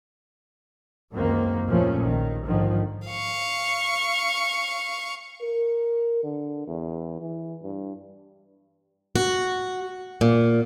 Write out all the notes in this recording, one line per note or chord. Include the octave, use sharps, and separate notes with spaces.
C#2 F#2 D#3 A#3 C4
D#2 A#2 F3 A3 C#4
A#1 D#3
G#2 D3 D#3 F3
F5 C#6
A#4
D3
E2
E3
G2
F#4
A#2